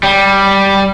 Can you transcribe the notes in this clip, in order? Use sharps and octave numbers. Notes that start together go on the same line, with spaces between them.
G3